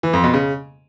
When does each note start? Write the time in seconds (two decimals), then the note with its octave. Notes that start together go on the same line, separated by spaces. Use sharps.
0.03 E3
0.13 F2
0.24 B2
0.34 C#3